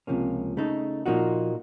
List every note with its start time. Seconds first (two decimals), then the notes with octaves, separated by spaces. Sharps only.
0.07 C#2 C3 F3 A#3 C#4
0.57 C#3 A3 D#4 A4
1.06 A#2 F3 A#3 D#4 F#4